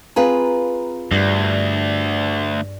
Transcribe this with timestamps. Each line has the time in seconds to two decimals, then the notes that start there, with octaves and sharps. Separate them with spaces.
0.16 C4 F4 G#4 B4 F5 A#5
1.11 D2 G2 D5 A#6